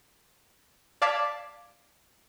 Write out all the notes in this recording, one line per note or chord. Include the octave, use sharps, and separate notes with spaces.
D5 F5 A5 D6 G#6 B6